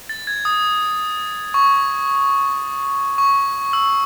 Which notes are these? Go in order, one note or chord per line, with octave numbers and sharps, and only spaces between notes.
A6
G#6
D#6
C#6
C#6
E6